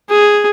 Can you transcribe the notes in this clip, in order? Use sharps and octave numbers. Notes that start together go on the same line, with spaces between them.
G#4